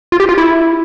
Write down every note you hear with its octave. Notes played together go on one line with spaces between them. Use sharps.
F4
G4
F4
E4